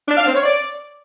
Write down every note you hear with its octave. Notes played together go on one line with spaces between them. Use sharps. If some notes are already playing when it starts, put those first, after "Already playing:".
D4
F5
C4
C#5
D5